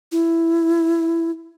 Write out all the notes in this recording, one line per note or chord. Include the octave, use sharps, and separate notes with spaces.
E4